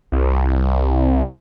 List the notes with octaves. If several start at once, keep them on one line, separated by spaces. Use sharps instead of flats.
C2